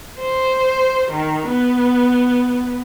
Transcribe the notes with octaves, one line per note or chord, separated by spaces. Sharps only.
C5
D#3
B3